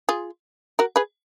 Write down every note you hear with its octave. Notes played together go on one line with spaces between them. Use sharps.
F4 G#4
F#4 A#4
G#4 B4